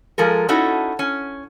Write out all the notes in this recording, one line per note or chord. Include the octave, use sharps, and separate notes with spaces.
F3 G#3 A4 A#4
C#4 D#4 E4 F#4 A4
C#4